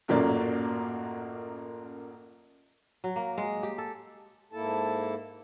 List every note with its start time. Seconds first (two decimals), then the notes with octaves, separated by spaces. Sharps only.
0.08 A1 F#2 A#2 F#3 A#3 D5
3.04 F#3
3.16 A#3
3.38 G#3
3.63 G4
3.78 A4
4.53 G#2 A#3 E4 A4 A5